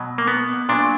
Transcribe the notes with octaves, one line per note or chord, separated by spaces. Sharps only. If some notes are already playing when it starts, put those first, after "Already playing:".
Already playing: B2 F#3
A#3
B3
A#2 F#3 D4